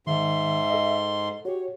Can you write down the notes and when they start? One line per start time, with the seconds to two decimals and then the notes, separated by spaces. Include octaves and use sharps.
0.07 G#2 D#3 E5 C6
0.70 A4 D#5
1.45 F#4 G4 C#5